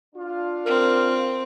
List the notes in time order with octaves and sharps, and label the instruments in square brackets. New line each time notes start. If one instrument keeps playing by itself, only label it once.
[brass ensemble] D4 F4
[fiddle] C4 [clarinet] A#4